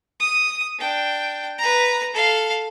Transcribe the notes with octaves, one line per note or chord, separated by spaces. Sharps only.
D#6
D4 G5
B4 A#5
A4 F5